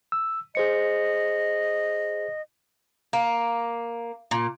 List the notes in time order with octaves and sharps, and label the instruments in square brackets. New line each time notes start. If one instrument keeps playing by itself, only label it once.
[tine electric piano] E6
[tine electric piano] G#4 C5 C#7 [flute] D#5
[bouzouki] A#3
A#2